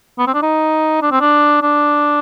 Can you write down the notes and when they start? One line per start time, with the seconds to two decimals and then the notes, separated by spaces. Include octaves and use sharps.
0.18 B3
0.27 C4
0.34 D4
0.42 D#4
1.02 D4
1.11 C4
1.20 D4
1.62 D4